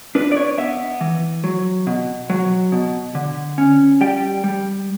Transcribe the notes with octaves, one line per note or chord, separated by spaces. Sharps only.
D4 B4
D5
C#5
B3 E5
E3
F#3
B2
F#3
B2
D3
C#4
G3 G5
G3